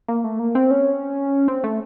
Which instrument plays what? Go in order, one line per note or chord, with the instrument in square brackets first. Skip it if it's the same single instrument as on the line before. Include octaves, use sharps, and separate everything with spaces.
[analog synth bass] A#3
A3
A#3
C4
C#4
C4
A3